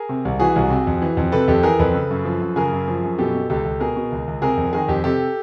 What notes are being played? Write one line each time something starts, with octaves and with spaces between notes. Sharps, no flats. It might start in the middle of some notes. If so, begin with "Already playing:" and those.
Already playing: G#4 A#4
C3
C2
E3 F#4 G#4
C2
C3
F2
E3
F2
C3 A4 B4
F2 G4 A4
E3 G#4 A#4
F2 A4 B4
C#3
F#2
F3
F#2
C#3 G#4 A#4
F#2
F3
F#2
B2 G4 A4
B2
C#2 G4 A4
C#2
B2 G#4 A#4
B2
C#2
C#2
C3 G#4 A#4
F2
D#3 G#4 A#4
F2 G4
C3 G4 A4